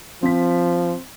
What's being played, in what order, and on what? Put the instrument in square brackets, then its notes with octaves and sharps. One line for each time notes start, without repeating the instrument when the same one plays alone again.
[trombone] F3 [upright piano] C4 B6